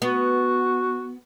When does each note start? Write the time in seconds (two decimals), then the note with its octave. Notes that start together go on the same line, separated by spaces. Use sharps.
0.02 B3 F#4